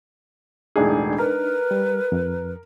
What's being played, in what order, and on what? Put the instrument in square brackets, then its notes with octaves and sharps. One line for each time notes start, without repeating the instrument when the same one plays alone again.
[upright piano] E1 A2 G#4 [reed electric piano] D4 D#4
[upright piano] A#4 [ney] B4
[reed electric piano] G3
F2